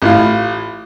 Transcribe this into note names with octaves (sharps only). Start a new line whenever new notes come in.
A1 A2 F4